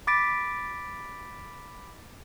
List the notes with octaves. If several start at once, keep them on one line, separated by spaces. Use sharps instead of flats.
B5 D6 A6 B6 D7